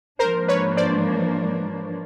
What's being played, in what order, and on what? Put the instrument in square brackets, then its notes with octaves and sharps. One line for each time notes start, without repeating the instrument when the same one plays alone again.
[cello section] G#2 F3 A#3 D4 [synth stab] A#4 C5
[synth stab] B4 C#5
C5 D5